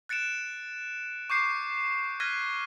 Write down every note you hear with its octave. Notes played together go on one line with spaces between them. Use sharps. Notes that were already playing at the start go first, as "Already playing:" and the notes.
F#6 A6 C#7 D7 E7
C#6 D6 G6 C7 C#7
F6 F#6 G#6 A#6 B6 D#7